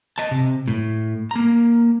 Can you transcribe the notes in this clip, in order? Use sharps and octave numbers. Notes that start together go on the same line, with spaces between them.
D#5 A5
C3
A2
A#3 A#5